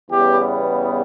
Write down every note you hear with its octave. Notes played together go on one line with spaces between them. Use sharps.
E2 C#3 G3 B3 G4